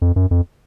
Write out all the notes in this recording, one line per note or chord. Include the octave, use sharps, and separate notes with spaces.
F2
F#2
F2